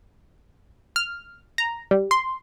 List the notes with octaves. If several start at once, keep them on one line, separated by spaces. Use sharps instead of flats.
F6
A#5
G3
C6